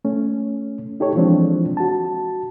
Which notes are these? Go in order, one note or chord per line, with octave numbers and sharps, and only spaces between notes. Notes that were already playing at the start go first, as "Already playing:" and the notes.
A3 C#4
D#4 G4 A4 C#5
E3 F3 G#3 C4 D4
F#4 A5